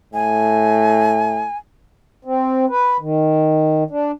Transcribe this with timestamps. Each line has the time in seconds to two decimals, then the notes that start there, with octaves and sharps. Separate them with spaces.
0.14 A2 G#5
2.25 C4
2.69 B4
3.00 D#3
3.90 D4